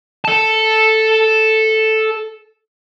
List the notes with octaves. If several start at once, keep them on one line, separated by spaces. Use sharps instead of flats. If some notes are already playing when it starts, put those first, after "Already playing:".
A4 A5